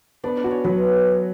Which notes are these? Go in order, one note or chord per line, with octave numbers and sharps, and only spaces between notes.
B3 D4 D5
D4 D5
F#4
C#4 C#5
F#3 B3 B4